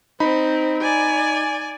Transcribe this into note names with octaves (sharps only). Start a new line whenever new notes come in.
C4 D#4 B5
D5 G#5